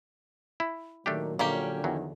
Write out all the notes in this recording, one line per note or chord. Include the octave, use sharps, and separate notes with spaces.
E4
A#2 D#3 F#3 A3 D4 G4
A#1 D3 A#3 C#4 G4
E2 D#3 F3 F#3